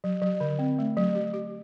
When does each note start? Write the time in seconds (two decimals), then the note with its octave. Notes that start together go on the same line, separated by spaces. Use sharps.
0.04 F#3
0.22 F#3
0.40 D3
0.59 C4
0.79 A3
0.97 F#3
1.15 G4
1.34 G4